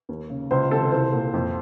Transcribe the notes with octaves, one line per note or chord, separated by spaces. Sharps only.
D#2
C#3
C#2 C5
C3 D#3 A4
C2 C5
A#2
F2